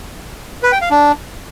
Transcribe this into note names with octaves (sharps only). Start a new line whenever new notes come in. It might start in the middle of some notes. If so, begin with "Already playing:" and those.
B4
G5
F5
D4